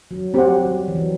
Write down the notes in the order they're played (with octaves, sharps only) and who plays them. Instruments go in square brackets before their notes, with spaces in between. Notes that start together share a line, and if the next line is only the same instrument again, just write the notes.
[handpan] F#3
[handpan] F#3 [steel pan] C4 G4 C5 F#5
[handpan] F#3
G3
E3
F#3